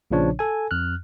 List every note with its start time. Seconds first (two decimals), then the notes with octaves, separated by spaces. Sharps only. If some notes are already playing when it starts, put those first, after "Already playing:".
0.11 A#1 A#2 C#3 F3 D4 C#5
0.39 A4 G#5
0.71 F2 F6 F#6